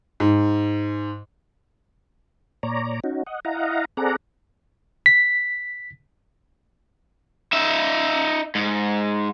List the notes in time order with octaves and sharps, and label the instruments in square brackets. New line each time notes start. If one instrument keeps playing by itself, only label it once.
[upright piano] G#2
[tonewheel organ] A#2 C#5 D5 A#5
C#4 D#4 F#4
D#5 F#5
E4 D#5 F5 F#5 A#5
C4 G#4 A4 D5 F#5 A#5
[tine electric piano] B6
[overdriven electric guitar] D#4 E5
G#2